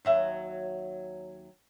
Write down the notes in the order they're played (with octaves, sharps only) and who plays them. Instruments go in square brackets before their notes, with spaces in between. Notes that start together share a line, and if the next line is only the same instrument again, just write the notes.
[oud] D#2 F#3 E5